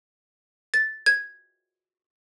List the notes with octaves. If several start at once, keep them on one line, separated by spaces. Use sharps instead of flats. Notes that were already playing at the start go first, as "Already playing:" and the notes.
A6
G#6